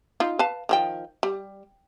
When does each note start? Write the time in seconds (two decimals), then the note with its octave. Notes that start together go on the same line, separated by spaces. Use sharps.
0.20 D#4 F4
0.39 B4 F5 A5
0.69 D#3 F3 G5
1.23 G3